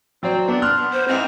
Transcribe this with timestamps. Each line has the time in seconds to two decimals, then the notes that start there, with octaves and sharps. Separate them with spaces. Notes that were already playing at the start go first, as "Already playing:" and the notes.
0.23 F#3 C4 D5
0.48 B3 D4
0.62 C6 F6 F#6
0.80 B3
0.93 C5
1.08 G#2 E3 C4 D#4